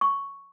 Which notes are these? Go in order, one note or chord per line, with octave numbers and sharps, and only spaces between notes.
C#6